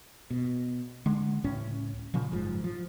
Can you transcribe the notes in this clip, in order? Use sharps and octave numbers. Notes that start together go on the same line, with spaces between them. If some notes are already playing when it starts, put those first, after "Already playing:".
B2
D3 G#3
C#2 A2 C#4
A#2 C#3 F3
F#1 G#2 F3
F3